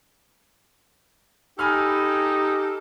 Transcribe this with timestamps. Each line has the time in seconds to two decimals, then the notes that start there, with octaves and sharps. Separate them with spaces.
1.59 D#4 G4 A4 G#5 B5 F6